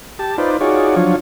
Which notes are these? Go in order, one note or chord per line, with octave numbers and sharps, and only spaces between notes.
G4 A5
D#4 F4 B4 C5 D5
D#4 F4 F#4 G#4 C#5 D5
F3 F#3 D4 F4 C#5